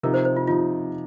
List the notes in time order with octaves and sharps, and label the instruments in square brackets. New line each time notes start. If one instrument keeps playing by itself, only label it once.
[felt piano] C3 F3 D#4 [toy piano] A#4
[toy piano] C5
C5
F4
[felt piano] C3 F3 D#4 [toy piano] F4